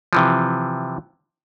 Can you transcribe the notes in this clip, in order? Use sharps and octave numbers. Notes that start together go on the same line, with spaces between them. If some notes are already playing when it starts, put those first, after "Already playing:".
C3 E3 F3